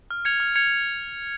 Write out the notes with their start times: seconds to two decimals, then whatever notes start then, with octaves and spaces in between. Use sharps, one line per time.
0.11 F6
0.25 G#6 C#7 F7
0.40 F6
0.56 G#6 C#7 F7